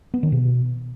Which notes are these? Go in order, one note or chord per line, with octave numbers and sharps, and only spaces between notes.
B3
D#3
B2